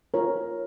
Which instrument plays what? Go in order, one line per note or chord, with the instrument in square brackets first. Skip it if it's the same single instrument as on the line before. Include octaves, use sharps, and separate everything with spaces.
[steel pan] F4 A#4 C#5